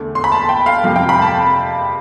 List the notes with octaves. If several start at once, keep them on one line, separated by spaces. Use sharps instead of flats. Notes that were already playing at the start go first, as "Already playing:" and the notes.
Already playing: E2 D3 A3
C6
B5
A5
G5
F5
F2 C3 F3 F5
G5
B5
A5